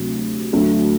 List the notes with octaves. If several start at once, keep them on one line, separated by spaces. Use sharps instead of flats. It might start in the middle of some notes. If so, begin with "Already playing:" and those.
Already playing: D2 C3 F#3
D2 D3 F#3 A3